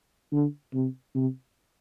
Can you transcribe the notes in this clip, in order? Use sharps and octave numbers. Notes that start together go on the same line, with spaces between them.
D3
C3
C3